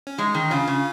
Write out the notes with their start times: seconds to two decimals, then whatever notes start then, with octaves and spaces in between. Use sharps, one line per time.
0.07 C#4
0.18 G#3 D#4
0.35 D#3
0.51 C#3 C#4 F4
0.68 C#3